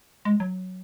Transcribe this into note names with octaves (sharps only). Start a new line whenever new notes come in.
G#3
F#3